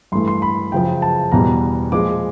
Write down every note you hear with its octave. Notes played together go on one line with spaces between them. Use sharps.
G2 E3 A3 C6
C6
B5
F#2 C#3 F3 G5
A5
E2 B2 G3 A#5
A#2 F3 G#3 D6